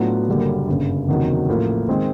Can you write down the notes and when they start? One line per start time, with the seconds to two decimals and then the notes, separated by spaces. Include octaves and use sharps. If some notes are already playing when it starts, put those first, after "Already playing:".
Already playing: A2 F#3 B3 D4 F4
0.28 F#1 F#2 D3 G3 A#3
0.68 G1 F#2 C#3
1.08 F#1 E2 C3 D#3 F#3
1.49 A1 A2 F3 A#3
1.89 D#3 G#3 C4